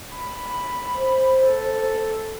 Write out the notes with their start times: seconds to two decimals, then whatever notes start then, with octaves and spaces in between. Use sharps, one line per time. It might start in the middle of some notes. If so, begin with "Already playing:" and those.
0.15 B5
0.96 C5
1.43 A4